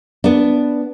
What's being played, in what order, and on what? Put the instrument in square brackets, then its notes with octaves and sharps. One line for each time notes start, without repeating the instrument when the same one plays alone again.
[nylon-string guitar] B3 D4